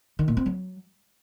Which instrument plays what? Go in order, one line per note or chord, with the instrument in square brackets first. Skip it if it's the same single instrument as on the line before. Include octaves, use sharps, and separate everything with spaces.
[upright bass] D#3
A#2
C4
F#3